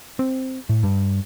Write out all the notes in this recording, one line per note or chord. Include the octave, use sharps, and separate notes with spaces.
C4
A2
G2